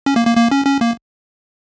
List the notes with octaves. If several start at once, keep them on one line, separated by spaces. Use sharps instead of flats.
C#4
A#3
A#3
A#3
C#4
C#4
A#3